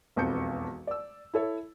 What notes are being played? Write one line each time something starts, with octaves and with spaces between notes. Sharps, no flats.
E1 B1 F2 B3 G6 C#7
D5 E6
E4 A4 C#5